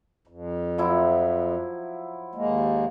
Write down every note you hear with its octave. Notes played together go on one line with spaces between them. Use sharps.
F2
F3 F#3 E4
D#2 G#3 A#3